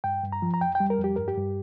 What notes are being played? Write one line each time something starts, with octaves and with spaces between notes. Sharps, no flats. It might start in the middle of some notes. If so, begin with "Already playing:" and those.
G2 G5
G2
A#5
F3
A#5
F2 G5
G5
G3
A#4
F2
G4
G2 A#4
G4
G2